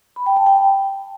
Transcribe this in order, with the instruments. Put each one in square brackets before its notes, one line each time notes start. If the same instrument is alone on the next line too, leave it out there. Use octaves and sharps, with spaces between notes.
[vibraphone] B5
G5
A5
G5
G5